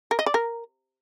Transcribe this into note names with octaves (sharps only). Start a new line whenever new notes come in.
A#4
D#5
D5
A#4